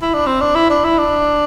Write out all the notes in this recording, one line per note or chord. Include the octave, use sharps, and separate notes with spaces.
E4
D4
C4
D4
E4
D4
E4
D4